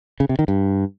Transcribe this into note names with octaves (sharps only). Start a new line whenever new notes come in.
C#3
C3
D#3
G2